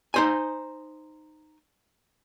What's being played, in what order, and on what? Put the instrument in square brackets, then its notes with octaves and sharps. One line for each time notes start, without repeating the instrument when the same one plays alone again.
[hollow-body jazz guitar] D#4 C5 G#5